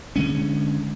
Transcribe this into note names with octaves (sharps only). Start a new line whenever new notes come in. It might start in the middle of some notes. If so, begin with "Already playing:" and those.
D3 G#3 C#4